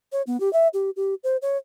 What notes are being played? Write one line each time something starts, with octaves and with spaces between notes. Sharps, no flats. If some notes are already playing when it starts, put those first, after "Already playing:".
C#5
B3
G4
E5
G4
G4
C5
C#5